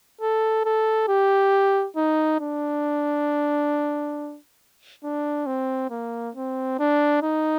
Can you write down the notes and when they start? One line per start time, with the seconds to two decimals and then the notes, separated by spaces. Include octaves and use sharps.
0.21 A4
0.65 A4
1.08 G4
1.96 D#4
2.40 D4
5.04 D4
5.46 C4
5.90 A#3
6.35 C4
6.79 D4
7.22 D#4